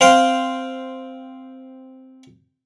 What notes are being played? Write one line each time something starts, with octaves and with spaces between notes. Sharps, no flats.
C4 F5 G5